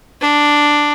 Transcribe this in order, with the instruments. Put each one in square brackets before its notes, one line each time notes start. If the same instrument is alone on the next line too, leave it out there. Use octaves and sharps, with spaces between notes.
[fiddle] D4